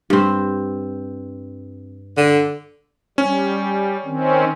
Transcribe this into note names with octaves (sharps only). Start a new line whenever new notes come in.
G2 C4
D3
G3 C#4
D#3 C4 C#4